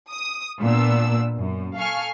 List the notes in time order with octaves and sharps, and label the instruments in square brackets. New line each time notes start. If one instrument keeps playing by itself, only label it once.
[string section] D#6
A#2 B3 D4 E6
F#2
A4 F5 G#5 C#6 F6